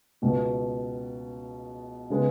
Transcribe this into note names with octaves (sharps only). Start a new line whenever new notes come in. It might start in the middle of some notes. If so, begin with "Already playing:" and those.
C#2 B2 B3
C#3 G#3 B3